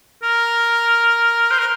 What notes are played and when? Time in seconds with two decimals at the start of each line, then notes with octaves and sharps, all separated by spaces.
0.23 A#4
1.51 C5
1.58 A#4